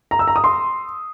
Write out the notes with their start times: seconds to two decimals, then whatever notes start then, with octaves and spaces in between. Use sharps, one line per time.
0.11 A#5
0.19 E6
0.27 A#5
0.36 D#6
0.44 C6